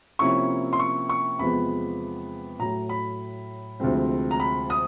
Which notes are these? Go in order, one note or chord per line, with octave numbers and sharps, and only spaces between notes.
C3 F3 A#3 C#4 E4 C#6
C6
C#6
C#6
E2 C3 F3 G#3 B3 B5
A2 F#3 A3 A#5
B5
D2 C3 F3 G#3 C4
A#5
B5
D#6